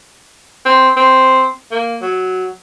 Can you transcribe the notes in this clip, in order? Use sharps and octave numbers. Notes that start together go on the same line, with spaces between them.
C4
C4
A#3
F#3